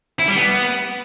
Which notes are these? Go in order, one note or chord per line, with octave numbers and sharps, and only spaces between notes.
E4
G3
B3